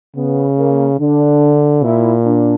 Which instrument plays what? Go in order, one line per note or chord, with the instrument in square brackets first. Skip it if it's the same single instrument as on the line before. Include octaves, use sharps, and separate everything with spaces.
[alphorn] C#3 [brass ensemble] B3
[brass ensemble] A#3
[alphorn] D3 [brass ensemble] D4
[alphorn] A#2 [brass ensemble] E4
[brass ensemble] D4